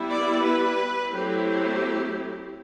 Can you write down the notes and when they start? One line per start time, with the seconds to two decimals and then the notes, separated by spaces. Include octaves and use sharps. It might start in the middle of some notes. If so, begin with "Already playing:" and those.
Already playing: G3 B3 E4
0.10 D5
0.45 B4
1.12 F#3 A3 C4 E4 G4